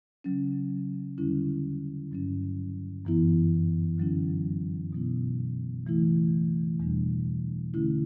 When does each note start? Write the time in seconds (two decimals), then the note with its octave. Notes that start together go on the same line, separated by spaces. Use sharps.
0.24 C#3 F#3 C#4
1.18 E2 D3 G3 C#4 E4
2.12 G2 F#3 C#4
3.05 F#2 E3 B3 E4
3.98 D3 F#3 C#4 E4
4.93 B2 F#3 B3 E4
5.86 C#3 E3 A3 E4
6.80 E2 B2 G3 D4
7.74 D3 A3 C#4 E4